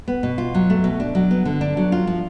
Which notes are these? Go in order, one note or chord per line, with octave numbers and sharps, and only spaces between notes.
B3
B2
F4
F#3
A3
B2
D4
F#3
B3
D3
D4
F#3
F4
F3